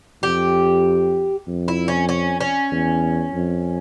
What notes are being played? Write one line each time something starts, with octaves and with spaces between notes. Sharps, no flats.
F2 G4
F2
E4
C#4
C#4
C#4
E2
F2